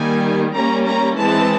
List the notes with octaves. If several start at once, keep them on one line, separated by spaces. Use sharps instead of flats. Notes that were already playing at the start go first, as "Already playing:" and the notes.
Already playing: D#3 G3 A#3 G#5
G3 A#3 C#4 A#5
A#5
E3 G#3 C4 A5